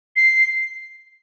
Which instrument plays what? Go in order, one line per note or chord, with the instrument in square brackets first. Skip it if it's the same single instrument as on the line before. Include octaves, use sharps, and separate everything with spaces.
[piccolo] C7